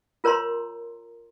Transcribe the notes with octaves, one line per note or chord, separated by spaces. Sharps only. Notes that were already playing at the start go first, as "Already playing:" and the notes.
F4 A#4 C#5 A#5 C6